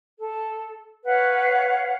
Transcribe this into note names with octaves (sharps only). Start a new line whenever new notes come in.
A4
B4 C#5 F5 F#5